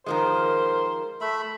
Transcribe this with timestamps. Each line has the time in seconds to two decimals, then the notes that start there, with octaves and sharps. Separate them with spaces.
0.06 D#3 F3 G#3 A#4 C5
1.21 A3 E5 B5